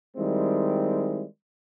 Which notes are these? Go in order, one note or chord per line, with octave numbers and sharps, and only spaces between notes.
D#3 G3 G#3 C4 E4